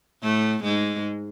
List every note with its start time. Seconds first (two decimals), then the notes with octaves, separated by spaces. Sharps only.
0.23 A2 A3
0.64 G#2 G#3